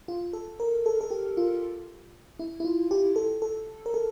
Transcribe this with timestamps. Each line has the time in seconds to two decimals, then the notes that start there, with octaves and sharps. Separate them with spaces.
0.08 F4
0.33 A4
0.60 A#4
0.86 A4
1.01 A4
1.10 G4
1.37 F4
2.39 E4
2.60 E4
2.65 F4
2.91 G4
3.16 A4
3.42 A4
3.86 A#4
3.94 A4